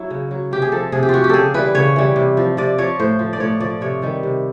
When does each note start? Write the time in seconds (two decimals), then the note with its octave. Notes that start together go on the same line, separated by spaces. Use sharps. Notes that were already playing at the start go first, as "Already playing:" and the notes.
Already playing: F#3 E4
0.10 C#3
0.31 F#3
0.51 C3 G4
0.62 G#4
0.72 F3 A4
0.92 C3 G#4
1.03 G4
1.09 F3 F4 F#4
1.24 G4
1.29 C#3 G#4 A4
1.54 E3 G3 B4
1.75 C#3 C#5
1.96 E3 G3
2.16 C3
2.37 F3
2.57 C3 D5
2.78 F3 C#5
2.99 A2 C5
3.19 F3
3.33 D5
3.40 A2 C#5
3.60 F3 D5
3.81 C3 C#5
4.02 D#3 G3
4.23 C3